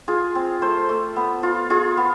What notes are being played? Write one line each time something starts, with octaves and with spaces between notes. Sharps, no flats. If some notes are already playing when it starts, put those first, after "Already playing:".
F4 G#4
C4
A3 C5
A3
B3
F4
F4 G#4
B3